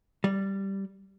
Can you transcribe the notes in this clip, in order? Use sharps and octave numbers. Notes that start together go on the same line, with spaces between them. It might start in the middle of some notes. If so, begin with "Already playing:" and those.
G3